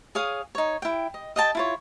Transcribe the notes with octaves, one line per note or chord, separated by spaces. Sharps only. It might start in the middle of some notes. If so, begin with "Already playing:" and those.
G#4 C#5 F5 D#6
D#4 C#5
E4 G5
D#5
D#5 G5 A5
E4 F4 C#5